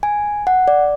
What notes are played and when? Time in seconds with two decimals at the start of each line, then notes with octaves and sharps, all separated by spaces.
0.03 G#5
0.47 F#5
0.68 D5